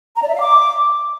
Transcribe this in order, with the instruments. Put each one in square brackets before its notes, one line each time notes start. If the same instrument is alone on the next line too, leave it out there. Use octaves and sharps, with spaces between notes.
[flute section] A#5
D5
E5
F5
D6